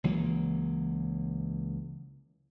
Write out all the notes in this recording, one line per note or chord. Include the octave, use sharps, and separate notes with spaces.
C#2 E3 F#3 A#3